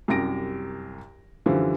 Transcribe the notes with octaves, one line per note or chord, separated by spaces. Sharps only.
C2 F#2 G4 A#6 D7
F#2 D3 E3 F3 G3